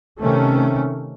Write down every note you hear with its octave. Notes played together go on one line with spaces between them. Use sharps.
C3 D#3 A3 C#4